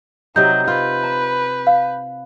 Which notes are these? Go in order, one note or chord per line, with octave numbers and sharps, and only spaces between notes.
C3 F#3 D#4 G6
F4 B4
A#5
F5